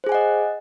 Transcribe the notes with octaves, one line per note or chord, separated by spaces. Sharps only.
G#4 C5 D#5 F#5 G#5